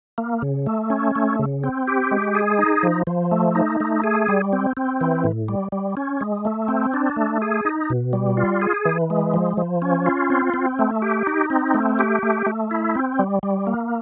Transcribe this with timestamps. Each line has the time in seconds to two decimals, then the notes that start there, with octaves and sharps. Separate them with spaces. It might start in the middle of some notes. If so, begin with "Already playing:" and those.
0.18 A#3
0.42 C#3
0.66 A3
0.90 C#4
1.15 A3
1.39 C#3
1.64 C4
1.88 G4
2.11 G#3
2.35 G#4
2.59 D#4
2.83 F3
3.07 F3
3.31 A3
3.55 D#4
3.80 A3
4.04 G#4
4.28 G3
4.53 C4
4.77 C4
5.01 E3
5.24 A2
5.48 G3
5.72 G3
5.97 C#4
6.21 G#3
6.45 A3
6.68 C4
6.94 D4
7.16 A3
7.42 G#4
7.65 D#4
7.90 B2
8.13 G3
8.37 F4
8.62 G#4
8.85 E3
9.10 G#3
9.34 F3
9.57 F3
9.82 C#4
10.06 F4
10.30 C4
10.54 C4
10.79 A3
11.02 G4
11.27 D#4
11.50 C4
11.74 A3
11.99 G4
12.23 A3
12.46 A3
12.71 E4
12.95 C4
13.19 G3
13.43 G3
13.67 A#3